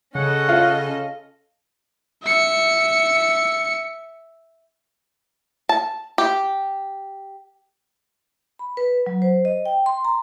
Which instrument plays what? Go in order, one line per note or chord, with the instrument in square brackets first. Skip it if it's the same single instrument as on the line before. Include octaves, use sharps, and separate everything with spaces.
[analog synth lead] C#3 [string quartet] C#4 A4 D#5 [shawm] F#5
[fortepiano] F4
[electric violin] E5 C#7
[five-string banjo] A5
G4
[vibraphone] B5
B4
F#3
C5
D#5
G5
C6
A#5